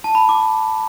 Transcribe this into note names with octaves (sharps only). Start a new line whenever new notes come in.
A5
B5
D6